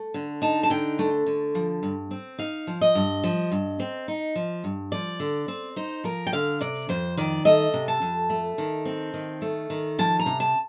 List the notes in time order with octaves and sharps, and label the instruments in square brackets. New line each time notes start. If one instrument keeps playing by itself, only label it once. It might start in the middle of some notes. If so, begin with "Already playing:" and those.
Already playing: [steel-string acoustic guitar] A3
D3
D#4 A5
A5
D3 G5
A3
D3
F3
G2
C4
D#4 F5
F3
D#5
G2
F3
G2
C4
D#4
F3
G2
F3 D5
D3
C4
D#4 C5
F3 A#4
G5
D3 F5
C3 D5
F2 C5
D#3 D5
A3 D#5
C3
A5
F2
A3
D#3
C4
D#3
A3
D#3
F3 A5
A#5
C3
A5